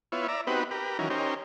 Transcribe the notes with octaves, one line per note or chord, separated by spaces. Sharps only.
B3 E4 F4 C#5
D5 E5 A#5
B3 C4 D#4 F#4 G4 B4
G4 A#4 B4
D#3 E3 F#3 C#4 A#4
C#4 D#4 G4 A#4 C5